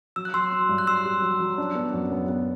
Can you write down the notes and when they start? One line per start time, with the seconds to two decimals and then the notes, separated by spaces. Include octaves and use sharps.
0.16 F#3 E6
0.25 F#6
0.33 F#3 C6 E6
0.51 F#3
0.69 G2
0.78 F#6
0.86 G4 C6 E6
1.05 G4
1.22 F#3
1.40 F#3
1.58 D4
1.75 B3
1.93 F#2
2.12 B3
2.29 B3